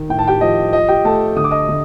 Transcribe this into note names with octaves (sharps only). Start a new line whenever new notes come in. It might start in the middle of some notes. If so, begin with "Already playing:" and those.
Already playing: D#3
A2 G5
A5
G4 G5
F3 D#5
F3 D#5
G4 G5
A3 A4 A5
D3 D#6
D6
D#5 D#6
D3